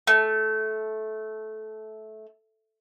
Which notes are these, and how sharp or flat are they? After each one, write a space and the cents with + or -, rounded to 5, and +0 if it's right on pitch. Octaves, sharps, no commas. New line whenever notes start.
A3 -15